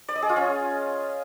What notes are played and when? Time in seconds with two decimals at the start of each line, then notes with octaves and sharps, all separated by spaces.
0.08 D5
0.15 D#5
0.22 G#4
0.29 F4
0.36 C#4